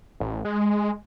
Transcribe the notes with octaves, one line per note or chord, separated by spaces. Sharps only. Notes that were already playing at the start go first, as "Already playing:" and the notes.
A1
G#3